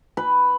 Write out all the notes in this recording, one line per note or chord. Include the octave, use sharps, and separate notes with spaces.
B4